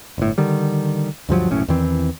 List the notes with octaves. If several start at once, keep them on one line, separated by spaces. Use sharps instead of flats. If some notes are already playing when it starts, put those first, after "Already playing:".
G1 A2
D3 D#3 G3
D2 G2 F3 F#3
F#1 B1 A2 C#4
E2 D#3 E3 C4